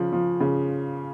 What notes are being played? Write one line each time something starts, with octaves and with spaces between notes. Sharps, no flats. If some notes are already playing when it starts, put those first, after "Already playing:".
Already playing: C#3 F3
F3
C#3